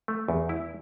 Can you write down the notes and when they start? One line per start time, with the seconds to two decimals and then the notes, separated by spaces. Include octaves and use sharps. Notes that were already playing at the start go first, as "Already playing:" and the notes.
0.08 A3
0.28 E2
0.49 E4